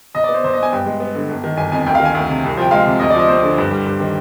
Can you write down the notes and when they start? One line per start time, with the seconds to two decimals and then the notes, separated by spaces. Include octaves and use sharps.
0.14 B1 D#5
0.24 B3 D5
0.34 C5
0.44 B1 C5
0.54 B2 D#5
0.63 G#5
0.72 G2 G5
0.86 G#3
1.00 B3
1.15 D3
1.29 G1
1.44 D#3
1.57 G1 G#5
1.72 F2 G#5
1.86 D2 G5
1.95 D#3 F5
2.05 G#5
2.15 D2
2.28 C3
2.44 C2
2.57 F3 G5
2.71 G#3 F5
2.86 C3
3.00 D2 D#5
3.10 F3 D5
3.20 D#5
3.28 C4 C5
3.43 D3
3.58 G2
3.71 G3
3.85 G2
4.00 D#3